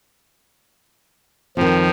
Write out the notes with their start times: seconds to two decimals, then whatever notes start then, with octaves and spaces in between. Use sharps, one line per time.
1.57 F2 D#3 F3